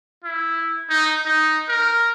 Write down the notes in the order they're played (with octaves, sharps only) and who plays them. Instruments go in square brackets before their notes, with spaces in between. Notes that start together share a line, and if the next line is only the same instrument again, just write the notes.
[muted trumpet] E4
D#4
D#4
A#4